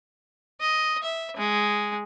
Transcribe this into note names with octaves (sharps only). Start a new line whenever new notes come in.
D#5
E5
G#3